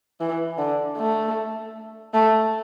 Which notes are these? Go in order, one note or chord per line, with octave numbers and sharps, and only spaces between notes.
E3
D3
A3
A3